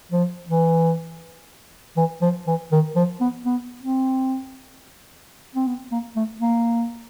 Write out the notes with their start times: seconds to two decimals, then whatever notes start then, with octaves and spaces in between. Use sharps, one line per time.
0.12 F3
0.49 E3
1.97 E3
2.22 F3
2.47 E3
2.72 D#3
2.96 F3
3.21 B3
3.45 B3
3.83 C4
5.55 C4
5.67 B3
5.91 A#3
6.16 A3
6.41 A#3